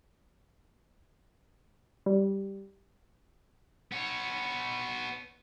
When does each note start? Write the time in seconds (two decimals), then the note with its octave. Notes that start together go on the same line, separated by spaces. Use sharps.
2.06 G3
3.92 B3 C#5